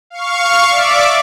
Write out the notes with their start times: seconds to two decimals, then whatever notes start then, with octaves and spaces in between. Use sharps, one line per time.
0.10 F5 C#6
0.69 D5 E5 D6